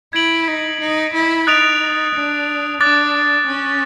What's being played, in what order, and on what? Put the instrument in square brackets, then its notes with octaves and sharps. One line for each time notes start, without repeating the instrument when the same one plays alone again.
[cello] E4 [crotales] G#6 B6 D7 F#7
[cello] D#4
D#4
E4
[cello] D#4 [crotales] D#6 F#6 A6 D7 F7
[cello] D4
[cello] D4 [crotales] D6 F#6 A6
[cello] C#4